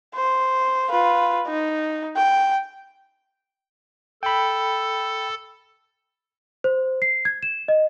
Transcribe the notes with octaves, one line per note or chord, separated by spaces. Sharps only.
C5
F4 B4
D#4
G5
A4 G5 B5
C5
C7
G#6
E7
D#5